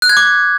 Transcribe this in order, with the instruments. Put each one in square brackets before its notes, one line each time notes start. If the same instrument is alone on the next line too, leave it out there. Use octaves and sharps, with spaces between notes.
[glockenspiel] F#6
G#6
D6